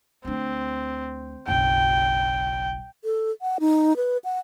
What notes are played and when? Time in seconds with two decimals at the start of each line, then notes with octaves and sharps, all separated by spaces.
0.25 D2 C4 D4
1.48 F#1 B1 G5
3.04 A4
3.42 F#5
3.60 D#4
3.97 B4
4.24 F#5